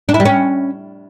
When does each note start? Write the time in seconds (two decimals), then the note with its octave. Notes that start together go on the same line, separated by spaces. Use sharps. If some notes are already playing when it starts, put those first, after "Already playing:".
0.09 D4
0.14 E4
0.20 G3
0.25 C#4